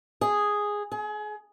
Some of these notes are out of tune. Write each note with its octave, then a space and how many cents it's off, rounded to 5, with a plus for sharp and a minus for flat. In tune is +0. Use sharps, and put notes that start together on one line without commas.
G#4 -5
G#4 +30